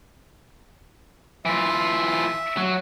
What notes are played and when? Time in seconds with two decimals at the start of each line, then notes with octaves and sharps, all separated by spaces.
1.45 E3 F4 E5
2.57 F#3